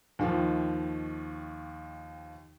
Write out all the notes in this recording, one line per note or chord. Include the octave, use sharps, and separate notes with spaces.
D#2 D#3 F3